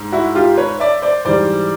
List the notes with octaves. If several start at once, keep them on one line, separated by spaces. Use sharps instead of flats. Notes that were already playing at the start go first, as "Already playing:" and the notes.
Already playing: G#2
E4 F#4
F4 G4
B4 C#5
D5 E5
C5 D5
G#2 E3 G3 C5 D5